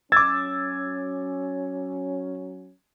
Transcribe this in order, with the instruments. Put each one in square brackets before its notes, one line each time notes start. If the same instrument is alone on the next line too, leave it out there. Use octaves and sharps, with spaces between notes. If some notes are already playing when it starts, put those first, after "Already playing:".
[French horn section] F#3 C#4 [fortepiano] D6 E6 [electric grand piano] G#6 A6